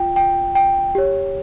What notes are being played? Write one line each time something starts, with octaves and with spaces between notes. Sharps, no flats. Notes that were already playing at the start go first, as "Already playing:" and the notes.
Already playing: F4 G5
G5
G5
G4 C#5